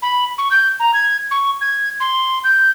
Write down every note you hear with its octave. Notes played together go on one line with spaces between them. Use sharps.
B5
C#6
G6
A#5
G#6
C#6
G#6
C6
G6